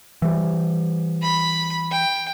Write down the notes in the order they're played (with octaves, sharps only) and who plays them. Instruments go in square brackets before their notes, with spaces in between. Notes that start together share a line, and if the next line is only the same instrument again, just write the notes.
[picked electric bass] E3 G3
[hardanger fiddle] B5
G5